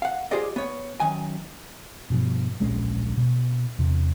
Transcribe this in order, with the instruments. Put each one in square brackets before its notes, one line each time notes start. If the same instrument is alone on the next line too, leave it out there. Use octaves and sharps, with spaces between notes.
[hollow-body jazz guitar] F5 F#5
F4 G4 G#4 C5 D5 D#5
B3 C#5
F#2 D#3 G#5
[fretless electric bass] G2 B2 F3
D1 A#1 G#3 C#4
B2
E2 C3